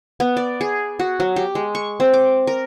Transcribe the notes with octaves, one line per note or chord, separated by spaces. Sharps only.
B3
D5
G#4
F#4
F#3
G4
G#3
C#6
C4
D6
A#4